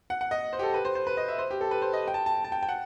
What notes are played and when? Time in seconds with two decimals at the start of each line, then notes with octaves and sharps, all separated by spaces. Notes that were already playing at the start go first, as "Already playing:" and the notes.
0.10 F#5
0.21 F#5
0.31 D#5
0.53 C5
0.59 G4
0.63 A4
0.74 B4
0.85 C5
0.95 C5
1.07 B4
1.17 D#5
1.28 E5
1.39 C5
1.51 G4
1.61 A4
1.71 B4
1.82 C5
1.93 D#5
2.08 G5
2.14 A5
2.26 A5
2.44 A5
2.52 G5
2.63 G5
2.69 F#5